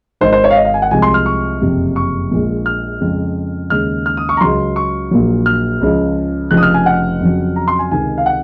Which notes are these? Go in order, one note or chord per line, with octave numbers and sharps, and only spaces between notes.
G#1 G#2 D#3 G#3 C5
C5
C#5
F5
D#5
F5
G#5
F#5
C2 C3 F3 G#3 G#5
C6
F6
C#6
F#1 F2 C3
C#6
A#1 A#2 G#3
F6
F2 C#3 G#3
D#2 C#3 G#3 F6
F6
D#6
C#6
A#5
C#2 C#3 F#3 C6
C#6
A#1 A#2 F#3
F6
C#2 C#3 F3
F1 F2 C#3 F3 F#6
D#6
F6
G#5
F#5
F2 C#3 F#3
A#5
C6
G#5
C#2 C3 D#3 G#5
F5
F#5